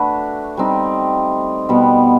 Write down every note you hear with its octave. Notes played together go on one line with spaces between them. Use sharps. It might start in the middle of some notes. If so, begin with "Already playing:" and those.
Already playing: A3 D4 F#4 B4
G3 C4 D#4
B2 G3 B3